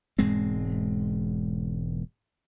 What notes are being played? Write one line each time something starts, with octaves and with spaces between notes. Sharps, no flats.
E1 G#2 G#3 C4